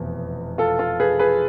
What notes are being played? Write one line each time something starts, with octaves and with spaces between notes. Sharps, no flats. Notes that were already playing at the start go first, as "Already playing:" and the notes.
Already playing: F1 E2 B2
F4 A4
F4 A4
G#4 B4
G#4 B4